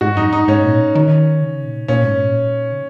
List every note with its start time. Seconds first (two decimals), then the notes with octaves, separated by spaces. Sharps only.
0.01 G#2 F#4
0.16 F#2 D#4
0.33 G#2 D#4
0.48 G#2 C#4
0.64 A#2
0.95 D#3
1.41 C#3
1.64 A#2
1.88 A#2 C#4
2.04 G#2
2.20 A#2
2.72 C#3